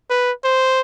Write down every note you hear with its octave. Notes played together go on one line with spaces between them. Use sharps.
B4
C5